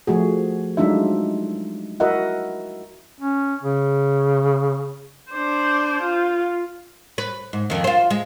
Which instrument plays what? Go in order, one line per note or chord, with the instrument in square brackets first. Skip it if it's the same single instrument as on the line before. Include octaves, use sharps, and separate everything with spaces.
[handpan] F3 A3 F#4 G#4
F#3 G#3 D4 D#4 F4 E5
E4 F#4 A#4 D#5 E5 F#5
[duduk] C#4
C#3
[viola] D4 C5
F4
[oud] B4
G#2
F2 D#3
F4 C5
G#3